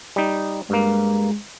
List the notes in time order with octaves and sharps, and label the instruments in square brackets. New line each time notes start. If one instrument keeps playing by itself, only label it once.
[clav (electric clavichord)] G3 D#4
[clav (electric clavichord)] G2 A#3 [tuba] G#3